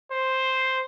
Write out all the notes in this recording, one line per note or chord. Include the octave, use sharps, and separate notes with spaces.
C5